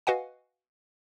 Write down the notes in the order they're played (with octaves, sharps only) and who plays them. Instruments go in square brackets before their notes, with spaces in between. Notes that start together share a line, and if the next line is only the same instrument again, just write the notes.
[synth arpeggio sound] F#4 B4 D#5 F5 F#5 G#5